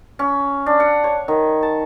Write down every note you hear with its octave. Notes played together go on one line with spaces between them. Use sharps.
C#4
D4
F#5
C#5
D#3
A5